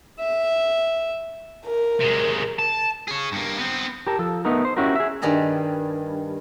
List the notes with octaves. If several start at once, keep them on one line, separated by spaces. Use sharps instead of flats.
E5
A#4
C3 G#3
A5
G#4 C#5
G2 A#3
B3 C4
G4 A#4 A5
F3 A4
A3 B3 D#4 A#4
C5
C#4 E4 F#4 G4 A#4
G#4 E5
G2 D#3 G3 G#4 A#5